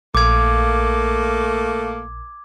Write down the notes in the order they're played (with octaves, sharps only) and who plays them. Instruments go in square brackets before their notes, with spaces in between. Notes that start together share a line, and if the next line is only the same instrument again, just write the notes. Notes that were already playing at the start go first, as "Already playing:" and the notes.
[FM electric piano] A#1 [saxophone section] A3 A#3 [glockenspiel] D6 G#6